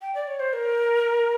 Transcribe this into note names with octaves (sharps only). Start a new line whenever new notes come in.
G5
D5
C#5
C5
A#4